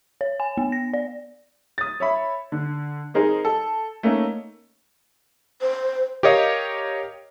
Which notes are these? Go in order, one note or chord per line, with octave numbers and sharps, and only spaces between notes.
C#5
G#5
B3
A#6
D5
D#6 A6
C#5 E5 B5
D3
C4 D#4 G#4 A#4 C5
A4
A3 A#3 C#4 D#4 A#4
C5
G4 A#4 C#5 D#5 F5